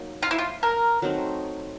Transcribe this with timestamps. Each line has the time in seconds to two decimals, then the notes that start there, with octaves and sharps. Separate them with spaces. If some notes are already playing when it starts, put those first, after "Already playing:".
Already playing: F#3 A#3 D#4
0.23 F4
0.31 E4
0.38 F4
0.63 A#4
1.02 F#3 A3 C4 D#4